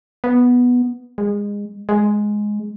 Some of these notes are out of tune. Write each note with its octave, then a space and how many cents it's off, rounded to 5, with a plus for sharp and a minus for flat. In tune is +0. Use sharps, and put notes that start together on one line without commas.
B3 -5
G#3 -25
G#3 +5